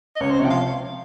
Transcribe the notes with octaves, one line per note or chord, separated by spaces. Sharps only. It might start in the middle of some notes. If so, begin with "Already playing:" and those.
D#5
C#2 C#5
C5
C3 F3 C#5 G5
F5